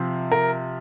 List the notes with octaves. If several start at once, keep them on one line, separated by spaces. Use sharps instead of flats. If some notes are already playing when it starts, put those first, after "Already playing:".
Already playing: C3 F3 C4
A#4